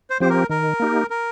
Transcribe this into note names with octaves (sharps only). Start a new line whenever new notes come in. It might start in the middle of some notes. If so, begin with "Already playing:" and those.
C5
F3 C4 G4 C5
A#4
D#3 A#4
A#3 D#4 G4
A#4